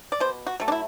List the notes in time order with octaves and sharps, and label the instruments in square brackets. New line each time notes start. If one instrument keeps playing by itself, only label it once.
[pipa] D5
B2 C5
F#4
F#3 A3
D4
E4